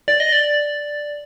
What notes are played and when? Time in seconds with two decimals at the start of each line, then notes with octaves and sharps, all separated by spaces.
0.08 D5
0.20 D#5
0.32 D5